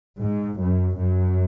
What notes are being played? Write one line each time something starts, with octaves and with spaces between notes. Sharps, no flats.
G#2
F#2
F#2